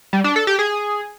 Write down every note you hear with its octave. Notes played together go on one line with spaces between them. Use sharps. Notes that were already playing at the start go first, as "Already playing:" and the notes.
G3
D4
A4
G4
G#4